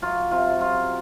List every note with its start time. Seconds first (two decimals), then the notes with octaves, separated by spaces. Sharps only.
0.02 F#3 F4
0.31 C3 F4
0.60 F#3 F4